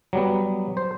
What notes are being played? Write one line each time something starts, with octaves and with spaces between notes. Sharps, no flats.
F#3 G3 B3
C5